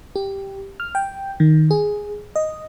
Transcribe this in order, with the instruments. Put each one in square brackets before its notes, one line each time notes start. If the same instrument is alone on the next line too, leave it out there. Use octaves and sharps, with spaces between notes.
[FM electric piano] G4
F6
G5
D#3
G#4
D#5